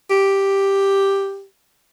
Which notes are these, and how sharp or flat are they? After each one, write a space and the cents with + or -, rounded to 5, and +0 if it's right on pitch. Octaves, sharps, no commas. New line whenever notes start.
G4 +0